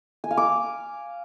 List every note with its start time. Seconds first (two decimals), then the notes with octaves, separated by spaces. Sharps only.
0.24 G#5
0.31 F5
0.37 D6